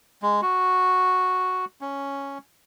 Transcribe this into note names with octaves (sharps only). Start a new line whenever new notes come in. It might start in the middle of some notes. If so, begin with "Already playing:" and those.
G#3
F#4
C#4